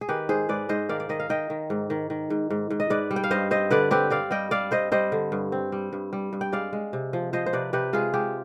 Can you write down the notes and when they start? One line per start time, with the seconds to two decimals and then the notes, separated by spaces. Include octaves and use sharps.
0.01 G#4
0.09 D#3 G4 B4
0.29 G#2 G#4 C5
0.49 G#2 B4 D5
0.69 G#2 C5 D#5
0.89 D#3 D5 F5
1.00 D5
1.09 D#3 D#5
1.20 F5
1.29 D#3 D#5 G5
1.50 D#3
1.70 G#2
1.90 D#3
2.10 D#3
2.30 G#2
2.50 G#2
2.70 G#2
2.80 D#5
2.90 G#2 B4 D5
3.11 G3
3.16 G5
3.24 F5
3.31 G2 C5 D#5
3.51 C4 C5 D#5
3.71 D3 B4 D5
3.91 C4 G4 B4
4.10 C4 D5 F5
4.31 G3 D#5 G5
4.51 G3 D5 F5
4.71 C4 C5 D#5
4.92 G3 C5 D#5
5.12 D3
5.32 G2
5.52 C4
5.72 G3
5.93 G2
6.13 G3
6.33 G2
6.41 G5
6.52 G#3 D5 F5
6.73 G#3
6.93 C3
7.13 F3
7.33 F3 C5 D#5
7.46 C5
7.53 C3 B4 D5
7.73 C3 G4 B4
7.93 G#3 F4 G#4
8.14 G#3 G4